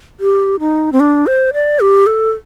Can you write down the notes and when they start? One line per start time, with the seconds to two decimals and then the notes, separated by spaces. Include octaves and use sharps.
0.20 G4
0.60 D#4
0.92 C4
1.00 D4
1.27 C5
1.53 D5
1.80 G4
2.06 A4